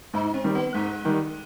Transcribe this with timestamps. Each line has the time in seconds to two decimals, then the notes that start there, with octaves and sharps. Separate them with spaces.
0.14 G#2 D#4
0.34 C4
0.44 D#3 G3
0.55 B3
0.74 G#2 G#3
1.05 D#3 G3